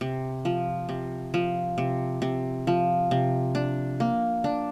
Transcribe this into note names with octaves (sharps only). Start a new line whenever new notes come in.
C3
F3
C3
F3
C3
C3
F3
C3
D4
A#3
D4